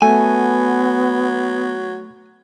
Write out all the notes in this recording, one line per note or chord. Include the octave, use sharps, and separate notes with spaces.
F#3 A3 B3 G#5